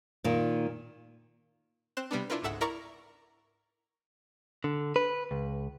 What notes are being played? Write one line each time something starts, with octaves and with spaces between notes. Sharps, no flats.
A#2 D#3
C4 C5 F#6 E7
C3 G3 B3 D4
D4 E4 F4 A#4 B4
G1 C#2 G#2 A4 E5 F#5
E4 A#4 D5 A#5 C#6 D6
D3
B4
C#2